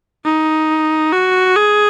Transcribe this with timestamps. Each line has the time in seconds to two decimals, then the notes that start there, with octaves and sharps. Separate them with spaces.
0.24 D#4
1.12 F#4
1.56 G#4